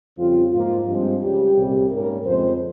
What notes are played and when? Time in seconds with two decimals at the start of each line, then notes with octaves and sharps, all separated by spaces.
0.17 F2 C#3 G3 C4 F4
0.52 G#2 F3 A#3 F4
0.87 G2 F3 G#3 C4 F4
1.21 C#2 C#3 G3 G4
1.57 C2 A#2 G3
1.91 G#2 G3 A#3 C#4 A#4
2.26 F2 C#3 F3 G#3 C4 C5